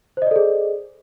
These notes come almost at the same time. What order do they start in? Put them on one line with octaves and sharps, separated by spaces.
C5 D#5 D5 A4 G#4